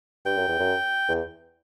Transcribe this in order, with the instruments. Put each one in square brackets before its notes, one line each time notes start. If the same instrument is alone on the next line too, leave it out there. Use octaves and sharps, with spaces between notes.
[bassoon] G2 [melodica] G5
[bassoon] F#2
E2
F#2
E2